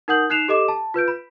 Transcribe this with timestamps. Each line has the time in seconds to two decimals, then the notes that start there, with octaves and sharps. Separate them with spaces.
0.08 D#4 A#4 F#5 D#6 G6 F#7
0.30 D#4 F#6 C7 E7 F7
0.48 G4 A4 D#5 D6 E7
0.68 A5
0.94 F4 B4 G6 D7
1.08 B5